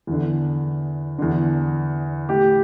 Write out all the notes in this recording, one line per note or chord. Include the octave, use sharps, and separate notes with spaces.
E2 D3
E2 D3
A2 E3 G4